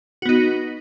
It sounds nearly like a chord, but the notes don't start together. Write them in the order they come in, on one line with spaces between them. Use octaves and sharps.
F#4 B3 D#4